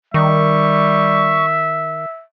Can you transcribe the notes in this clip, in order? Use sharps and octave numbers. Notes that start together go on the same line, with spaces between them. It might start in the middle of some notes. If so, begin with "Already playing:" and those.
D#3 G3 E5 C#6